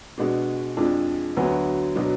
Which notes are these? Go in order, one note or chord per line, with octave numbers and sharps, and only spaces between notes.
B2 G#3 D4 F#4
F2 F3 G#3 D4
D2 D3 F#3 B3
B2 F#3 D4